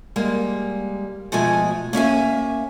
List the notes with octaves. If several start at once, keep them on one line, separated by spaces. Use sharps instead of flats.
G3 G#3 A#3
B2 F3 G#3 A3 G#5
A#3 C#4 E5 G#5